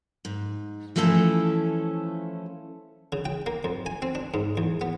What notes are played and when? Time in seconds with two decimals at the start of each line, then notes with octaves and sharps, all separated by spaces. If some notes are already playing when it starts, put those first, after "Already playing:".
0.25 G#2
0.96 E3 F3 A3 C#4 E4 A4
3.12 C#3
3.25 G5
3.46 A#3
3.64 F2
3.86 G#5
4.02 C4
4.15 D4
4.34 G#2
4.57 E2
4.81 B3